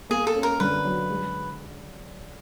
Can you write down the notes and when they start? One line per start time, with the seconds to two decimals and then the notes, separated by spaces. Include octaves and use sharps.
0.10 A#3 G#4
0.27 A4
0.35 C#4
0.43 A#4
0.60 D3 B4
0.85 F#3
1.10 G#3